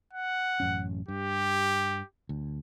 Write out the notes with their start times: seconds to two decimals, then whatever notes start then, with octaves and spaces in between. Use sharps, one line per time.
0.14 F#5
0.60 A1 F#2 C#4
1.08 G2 G4
2.29 D2